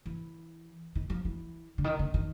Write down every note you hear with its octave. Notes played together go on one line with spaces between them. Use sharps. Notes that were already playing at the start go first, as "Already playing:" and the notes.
E3
D#3
F3
E3
D3
D#3
D3
D#3